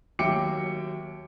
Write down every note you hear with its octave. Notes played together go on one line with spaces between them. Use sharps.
D#2 F#3 E5 G5 D6 C#7